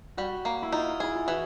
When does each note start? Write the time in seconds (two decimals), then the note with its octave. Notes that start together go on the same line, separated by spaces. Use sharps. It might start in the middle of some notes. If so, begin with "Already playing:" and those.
0.17 G3 F#4
0.45 A#3
0.62 E4
0.72 D#4 F4
1.00 E4 G#4
1.16 F4
1.27 E3 F#4